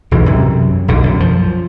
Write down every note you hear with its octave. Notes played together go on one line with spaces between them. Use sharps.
B1 G#2 E3
F#2 C3
B1 D3
F#2
F3